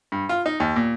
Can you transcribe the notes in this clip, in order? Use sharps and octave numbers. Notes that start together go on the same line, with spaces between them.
G2
F4
D#4
D#2
A#2